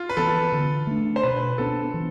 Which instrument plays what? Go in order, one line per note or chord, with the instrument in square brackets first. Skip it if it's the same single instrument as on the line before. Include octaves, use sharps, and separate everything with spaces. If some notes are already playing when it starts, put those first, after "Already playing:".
Already playing: [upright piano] F4
B4
[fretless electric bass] E3 B3 [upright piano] A4
[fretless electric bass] D3
A3 D4
[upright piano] C5
[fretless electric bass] B2 [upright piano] B4
[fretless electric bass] B3 D4 [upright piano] A4
[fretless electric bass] E3